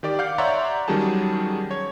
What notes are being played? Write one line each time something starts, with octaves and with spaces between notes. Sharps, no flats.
D#3 G4 D5 D6
F5 F#5 D6 G6
C#5 D5 E5 F#5 A#5 C6
D#3 F#3 G3 C#4 G#4 A5
C#5 G#6